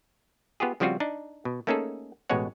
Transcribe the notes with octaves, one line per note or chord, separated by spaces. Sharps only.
B3 F4 G4 G#4
C#3 F3 G3 C4 F4 F#4
D4 D#4
B2
A3 A#3 C#4 D#4 G#4 A4
A1 B2 G#3 C#5 F#5